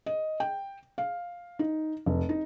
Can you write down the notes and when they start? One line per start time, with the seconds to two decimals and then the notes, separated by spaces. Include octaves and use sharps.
0.06 D#5
0.40 G5
0.98 F5
1.59 D#4
2.06 F1
2.29 D#4